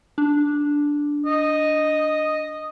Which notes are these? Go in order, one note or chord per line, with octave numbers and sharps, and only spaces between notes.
D4
D#5